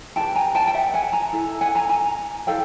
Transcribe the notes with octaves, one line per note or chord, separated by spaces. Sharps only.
E4 G4 B4 G5 A5
G#5 A#5
G5 A5
G5
E5 F#5
F#5 G#5
G#5 A#5
E4 A4
F#5 G#5
G#5 A#5
G#5 A#5
E4 A4 F5 G5